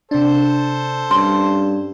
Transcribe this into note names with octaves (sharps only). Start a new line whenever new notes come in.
C3 D4 A4 C5
G2 C#4 C6